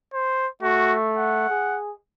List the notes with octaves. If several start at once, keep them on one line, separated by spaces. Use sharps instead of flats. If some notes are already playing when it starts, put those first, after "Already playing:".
C5
A3 F#4
F#5
G#4